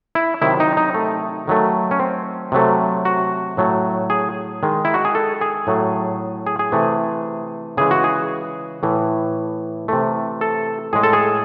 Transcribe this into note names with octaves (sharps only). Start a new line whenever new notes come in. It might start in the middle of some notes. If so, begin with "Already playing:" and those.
E4
C3 D#3 F#3 E4
D#4
D#4
A3
D#3 F#3 A3
C#4
C4
C3 F#3 A3
F#4
A2 F#3 A3
G#4
D#3 G#3
E4
F#4
G#4
A4
G#4
A2 F#3 A3
G#4
G#4
C3 E3 A3
C#3 E3 G#3 G#4
F#4
G#4
A2 E3 A3
C3 E3 A3
A4
A2 G#3 G#4
A4
G#4